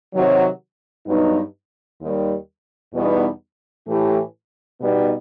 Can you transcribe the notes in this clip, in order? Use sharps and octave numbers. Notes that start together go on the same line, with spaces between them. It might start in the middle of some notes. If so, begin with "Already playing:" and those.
C3 D#3 F#3
G2 F#3 B3 D#4
D#2 D#3 G3
E2 B2 G3 B3 D#4
A2 E3 A3 E4 G4
B2 G3 B3 D#4